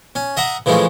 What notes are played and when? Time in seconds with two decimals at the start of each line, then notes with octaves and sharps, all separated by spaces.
0.15 C#4
0.37 D#5 E5 F#5 A#5
0.66 C#3 E3 F3 G#3 A3